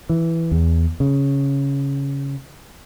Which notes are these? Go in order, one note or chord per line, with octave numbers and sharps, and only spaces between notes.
E3
E2
C#3